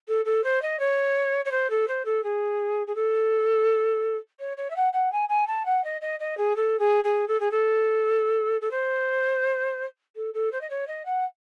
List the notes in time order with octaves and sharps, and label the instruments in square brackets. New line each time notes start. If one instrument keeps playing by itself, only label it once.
[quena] A4
A4
C5
D#5
C#5
C#5
C5
A4
C5
A4
G#4
G#4
A4
C#5
C#5
E5
F#5
F#5
G#5
G#5
A5
F#5
D#5
D#5
D#5
G#4
A4
G#4
G#4
A4
G#4
A4
A4
C5
A4
A4
C5
D#5
C#5
D#5
F#5